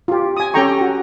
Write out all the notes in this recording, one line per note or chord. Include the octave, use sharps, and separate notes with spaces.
F4 G4
G#5 D#6
C#4 G4 A4 G5 A#5 C#6
F#4